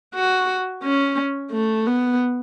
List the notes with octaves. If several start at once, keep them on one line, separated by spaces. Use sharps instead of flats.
F#4
C#4
A3
B3